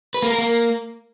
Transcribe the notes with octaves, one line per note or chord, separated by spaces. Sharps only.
B4
A#3
A#4
A#3